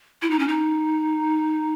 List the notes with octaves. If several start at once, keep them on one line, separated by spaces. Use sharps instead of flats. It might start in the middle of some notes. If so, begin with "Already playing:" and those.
E4
D#4
C#4
D#4